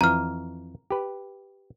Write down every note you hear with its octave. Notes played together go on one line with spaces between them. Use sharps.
F2 E3 A#5 F6
G4 B4